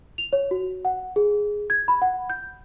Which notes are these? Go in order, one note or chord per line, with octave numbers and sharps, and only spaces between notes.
F7
C#5
F#4
F#5
G#4
G#6
B5
F#5
G6